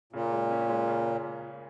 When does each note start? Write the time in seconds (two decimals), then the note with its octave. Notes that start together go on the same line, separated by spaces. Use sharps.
0.13 A#2 C#3
0.32 G#3
0.51 C#4
0.69 G#3
0.88 C#3